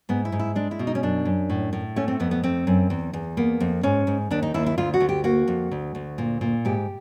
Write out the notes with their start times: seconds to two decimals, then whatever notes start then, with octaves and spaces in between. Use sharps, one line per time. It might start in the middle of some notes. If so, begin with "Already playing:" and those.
0.09 G#2 B3
0.25 E4
0.32 G#2
0.39 E4
0.55 G#3 D4
0.71 E4
0.79 B2
0.87 D#4
0.95 C#4
1.03 F#2 D4
1.25 F#2
1.50 A2
1.73 A2
1.96 A3 C#4
2.08 C4
2.20 F2 B3
2.31 B3
2.43 A3 C4
2.67 F#2
2.90 E2
3.14 E2
3.37 A#3 B3
3.60 F2
3.83 G#2 C#4
4.07 G#2
4.31 D#2 D4
4.43 D#4
4.54 D#2 E4
4.66 E4
4.78 D2 F4
4.94 F#4
5.00 D2
5.09 G4
5.24 A#3 F#4
5.48 F2
5.71 D2
5.95 D2
6.18 A#2
6.41 A#2
6.65 G#2 G4